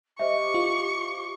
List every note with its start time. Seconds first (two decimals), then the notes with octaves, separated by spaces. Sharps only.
0.19 G4 C5 D#5 E5 C#6
0.54 F4